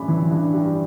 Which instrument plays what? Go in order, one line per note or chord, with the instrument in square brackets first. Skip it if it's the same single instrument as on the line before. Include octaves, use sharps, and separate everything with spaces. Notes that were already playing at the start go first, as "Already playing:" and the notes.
Already playing: [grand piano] A1 G2 G3 B5
E3
G2
G3